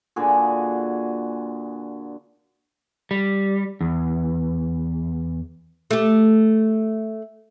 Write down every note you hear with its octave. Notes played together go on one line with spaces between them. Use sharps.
A#2 D3 F#4 G#4
G3
E2
A3 G4